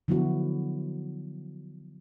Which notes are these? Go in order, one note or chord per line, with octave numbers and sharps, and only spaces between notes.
D3 F3 F#3 B3 E4 F#4